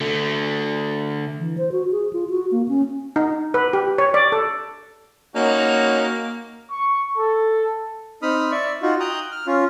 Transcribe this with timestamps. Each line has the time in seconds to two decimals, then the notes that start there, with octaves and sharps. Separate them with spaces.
0.01 D3 A3
1.39 E3
1.58 C5
1.72 F#4
1.91 G#4
2.13 F4
2.30 F#4
2.51 A#3
2.68 C#4
3.16 D#4
3.54 B4
3.73 G4
3.98 C#5
4.14 D5
4.32 A4
5.36 A#3 C#4 D#4 F#4
6.71 C#6
7.18 A4
8.22 C4 D#4 B5 D#6 F6
8.51 D5 E5 C#6
8.82 D#4 F4 F#4
9.00 G5 A#5 D#6 F#6
9.32 F6
9.47 C#4 F4